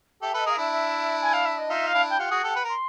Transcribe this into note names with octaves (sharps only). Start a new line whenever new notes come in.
G4 A4 E5
A4 B4 D#5
G#4 A#4 F5
D4 E4 E5
E5
G#5
F5
E5
D#5
D#4 F4 E5
F5
D4 E4
G5
F4 G4 F#5
F#4 G#4
G4 A4
B4
A#4 C6